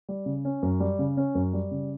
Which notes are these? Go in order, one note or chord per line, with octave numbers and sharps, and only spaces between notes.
G3
C#3
C#4
F#2
G3
C#3
C#4
F#2
G3
C#3